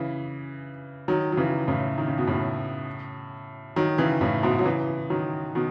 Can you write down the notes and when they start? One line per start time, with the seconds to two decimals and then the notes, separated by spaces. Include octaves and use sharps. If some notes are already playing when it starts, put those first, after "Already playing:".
Already playing: C#3 E3
1.08 D#3 F#3
1.32 F#3
1.37 C#3 E3
1.68 A2 C#3
1.98 D#3
2.07 C#3
2.18 B2
2.27 A2 C#3
3.76 D#3 F#3
3.98 C#3 E3
4.21 A2 C#3
4.43 G#2 B2
4.59 F#3
4.65 C#3 E3
5.10 D#3 F#3
5.55 B2 D#3